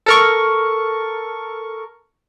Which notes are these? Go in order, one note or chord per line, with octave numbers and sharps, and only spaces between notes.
A4 A#4 C#6